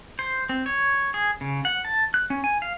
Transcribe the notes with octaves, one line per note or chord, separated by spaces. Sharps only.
C5
C4
C#5
G#4
C#3
F#5
A5
F#6
C#4
G#5
F5